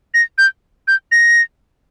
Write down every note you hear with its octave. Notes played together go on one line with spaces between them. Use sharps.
A#6
G6
G6
A#6